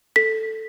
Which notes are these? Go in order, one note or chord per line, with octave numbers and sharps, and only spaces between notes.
A4 B6